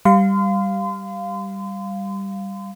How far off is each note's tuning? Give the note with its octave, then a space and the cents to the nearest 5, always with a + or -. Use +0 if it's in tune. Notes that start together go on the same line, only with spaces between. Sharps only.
G3 +0 F5 +0 C6 -35